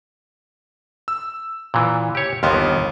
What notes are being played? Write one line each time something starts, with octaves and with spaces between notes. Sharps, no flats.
E6
A#2 E3
G4 C#5
G1 D#2 D#3 B3 C6 F6